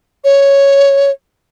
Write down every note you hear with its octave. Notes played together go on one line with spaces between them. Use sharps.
C#5